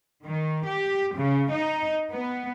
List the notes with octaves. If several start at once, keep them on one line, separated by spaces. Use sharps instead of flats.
D#3
G4
C#3
D#4
B3